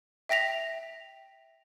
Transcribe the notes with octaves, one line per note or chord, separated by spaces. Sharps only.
E5 G5 A#6 B6 F7